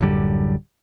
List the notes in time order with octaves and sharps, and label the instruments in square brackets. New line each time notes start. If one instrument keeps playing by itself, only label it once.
[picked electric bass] D1 F#2 D3 G3